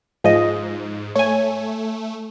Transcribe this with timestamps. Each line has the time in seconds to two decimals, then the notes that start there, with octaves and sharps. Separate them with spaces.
0.24 G#2 F3 G#3 D#5
1.15 A3 C#5 G#5